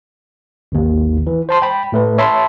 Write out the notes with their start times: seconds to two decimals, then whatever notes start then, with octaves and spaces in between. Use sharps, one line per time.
0.72 G#1 D#2
1.27 E3
1.49 C5 A5 C6
1.62 G5 B5
1.92 A2 A3 B4
2.18 C#5 E5 A5 B5 C6